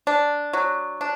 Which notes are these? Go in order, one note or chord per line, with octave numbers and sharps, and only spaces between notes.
D4
F#3
D4